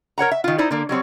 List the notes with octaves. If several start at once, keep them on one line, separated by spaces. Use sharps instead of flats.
A#4 C#5 F#5 A#5
E5
D#3 F4
D#4 E4 C5 D5
D3 A#3
F#3 G3 C4 C#5